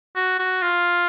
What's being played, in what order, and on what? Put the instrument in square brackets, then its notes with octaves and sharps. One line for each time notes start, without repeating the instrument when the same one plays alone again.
[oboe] F#4
F#4
F4